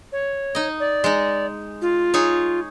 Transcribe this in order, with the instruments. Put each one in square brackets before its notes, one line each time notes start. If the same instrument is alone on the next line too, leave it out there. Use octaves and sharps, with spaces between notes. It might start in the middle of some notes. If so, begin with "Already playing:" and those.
[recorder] C#5
[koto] D#4 D#5
[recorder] D5
[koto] G#3 D#4
[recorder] F4
[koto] D#4 G#4 C#5